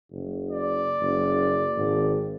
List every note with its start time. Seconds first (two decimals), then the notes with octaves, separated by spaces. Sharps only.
0.12 F#1
0.50 D5
1.01 F#1
1.77 G#1